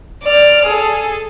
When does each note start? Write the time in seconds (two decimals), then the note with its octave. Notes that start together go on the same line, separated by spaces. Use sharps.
0.23 D5 F6
0.66 G#4 A4